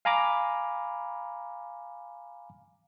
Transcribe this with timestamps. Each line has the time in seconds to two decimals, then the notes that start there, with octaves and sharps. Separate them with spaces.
0.05 F5 G#5 A#5 B5 D6